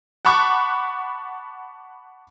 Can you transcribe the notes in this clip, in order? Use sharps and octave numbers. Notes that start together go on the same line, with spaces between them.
F#5 A5 B5 C#6 D6 F#6